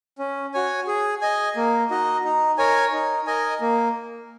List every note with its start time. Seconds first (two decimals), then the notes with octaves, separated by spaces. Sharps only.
0.19 C#4
0.54 F#4 C#5 G#5
0.87 G#4
1.21 D#5 G#5
1.56 A#3
1.90 D#4 F#4 D#5
2.24 D#4
2.58 A#4 C#5 G#5
2.93 D#4
3.27 A#4 D#5 G#5
3.61 A#3